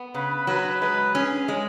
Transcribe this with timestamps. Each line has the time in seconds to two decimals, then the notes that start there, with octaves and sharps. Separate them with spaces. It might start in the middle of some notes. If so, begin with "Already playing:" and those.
Already playing: B3
0.15 C#3 B4
0.47 F#3 B4
0.82 G#3 B4
1.15 C#4 G#4
1.48 G#3